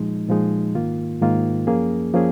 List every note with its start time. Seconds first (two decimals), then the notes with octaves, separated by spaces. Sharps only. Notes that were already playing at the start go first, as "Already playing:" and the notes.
Already playing: A#2 F3 G#3 D#4
0.28 A#2 F3 G#3 D#4
0.75 G#2 D#3 A#3 F4
1.21 G#2 D#3 A#3 F4
1.67 F#2 F3 A#3 C#4 G#4
2.14 F3 A#3 C#4 G#4